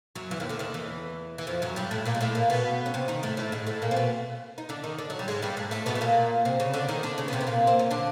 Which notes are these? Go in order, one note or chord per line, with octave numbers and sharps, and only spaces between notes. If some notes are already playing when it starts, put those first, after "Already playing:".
F#2 F#3
E2 E3
D#2 D#3
D2 D3
D#2 D#3
E2 E3
E3
F2 F3
F#2 F#3
G2 G3
A2 A3
A#2 A#3
G#3
A2 A3
A#2 A#3
B2 B3
C#4
C3 C4
D#3 D#4
A2 A3
A2 A3
G#2 G#3
A2 A3
A#2 A#3
C4
B2 B3
D#4
D3 D4
D#3 D#4
D3 D4
F#3
G3
G#2 G#3
G2 G3
G#2 G#3
A2 A3
B2 B3
A3
A#2 A#3
C3 C4
C#3 C#4
D3 D4
D#3 D#4
D3 D4
C#3 C#4
B3
C3 C4
B3
A#2 A#3
C4
C#4
D3 D4